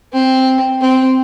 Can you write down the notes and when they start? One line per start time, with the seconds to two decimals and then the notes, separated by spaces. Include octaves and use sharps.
0.13 C4
0.81 C4